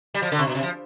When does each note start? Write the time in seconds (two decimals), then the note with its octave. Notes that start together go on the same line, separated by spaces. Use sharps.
0.14 G3
0.22 F3
0.32 D3
0.39 C3
0.47 B2
0.55 C3
0.63 F3